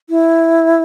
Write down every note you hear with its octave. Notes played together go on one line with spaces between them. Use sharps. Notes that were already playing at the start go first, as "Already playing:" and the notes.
E4